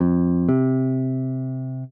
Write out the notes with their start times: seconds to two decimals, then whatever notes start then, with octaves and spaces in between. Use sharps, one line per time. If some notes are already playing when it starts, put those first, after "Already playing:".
0.01 F2
0.49 C3